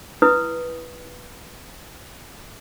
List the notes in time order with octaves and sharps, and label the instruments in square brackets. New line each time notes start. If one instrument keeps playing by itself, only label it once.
[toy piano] E4 B4 D#6